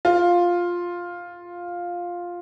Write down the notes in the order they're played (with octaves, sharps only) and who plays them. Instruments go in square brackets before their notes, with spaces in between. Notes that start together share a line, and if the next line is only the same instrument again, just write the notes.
[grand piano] F4